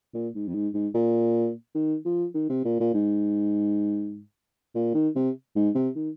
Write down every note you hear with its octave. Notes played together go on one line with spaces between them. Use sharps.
A#2
G#2
F2
G#2
G#2
A#2
D#3
F3
D#3
C3
A#2
A#2
G#2
A#2
D#3
C3
G#2
C3
D#3